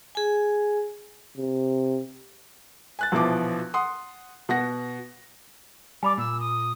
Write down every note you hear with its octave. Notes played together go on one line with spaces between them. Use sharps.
G#4 G#5
C3
G#5 F#6 A6
A#1 B2 E3 F3 D6
F#5 C6 D#6
B2 F#5 A#6
G3 D5 G#5 B5 D6
A#2 E6
D#6